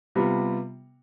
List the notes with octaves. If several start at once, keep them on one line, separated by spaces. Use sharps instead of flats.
C3 G3 B3 F4